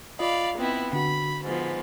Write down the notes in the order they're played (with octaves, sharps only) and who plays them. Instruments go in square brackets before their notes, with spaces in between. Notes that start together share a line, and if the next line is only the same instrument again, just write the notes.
[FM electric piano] F4 D#5 [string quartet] D5 F5 B5
[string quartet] B3 C4 E4
[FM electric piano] D3 F#4 [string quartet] B5
[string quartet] G#2 F3 B3